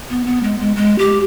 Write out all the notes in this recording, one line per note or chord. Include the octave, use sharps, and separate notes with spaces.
B3
B3
G#3
G#3
G#3
G4